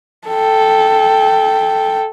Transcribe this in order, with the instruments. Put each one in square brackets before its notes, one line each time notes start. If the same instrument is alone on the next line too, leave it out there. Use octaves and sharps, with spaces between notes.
[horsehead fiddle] A4 G5